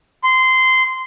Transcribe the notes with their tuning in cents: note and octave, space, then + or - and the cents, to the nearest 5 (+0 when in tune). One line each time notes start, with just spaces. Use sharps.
C6 -15